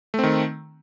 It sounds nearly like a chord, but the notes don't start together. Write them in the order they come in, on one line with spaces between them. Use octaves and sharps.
A3 C4 D#3